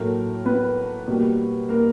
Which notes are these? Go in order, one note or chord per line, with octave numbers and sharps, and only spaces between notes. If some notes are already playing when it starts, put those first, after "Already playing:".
Already playing: A2 F#3 A3 A#3 A#4
B3 B4
B2 G3 A#3
A#3 A#4